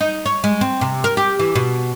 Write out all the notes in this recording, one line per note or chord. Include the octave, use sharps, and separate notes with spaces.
D#4
C#5
G#3
C4
C3
A#4
G4
E3
B2